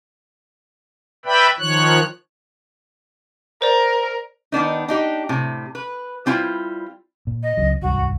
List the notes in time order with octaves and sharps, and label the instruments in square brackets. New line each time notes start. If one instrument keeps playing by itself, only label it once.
[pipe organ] B4 D5 E5 G5 B5
D#3 F3 C#5 F#6
[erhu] A#4 [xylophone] C5 D5
[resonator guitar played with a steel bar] D#3 B3 D4 D#4
D4 D#4 G4
A2 C3
B4
G3 C4 E4 F4
[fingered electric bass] A#2
[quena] D#5
[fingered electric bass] C#2 C#3 F#3
[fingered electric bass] D1 C2 G2 [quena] F#4